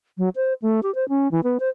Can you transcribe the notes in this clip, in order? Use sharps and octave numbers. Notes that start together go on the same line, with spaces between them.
F#3
C5
A3
G4
C5
C#4
E3
B3
C5